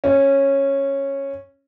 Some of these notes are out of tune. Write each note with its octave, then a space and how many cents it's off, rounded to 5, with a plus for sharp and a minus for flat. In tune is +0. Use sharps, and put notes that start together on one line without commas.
C#4 -10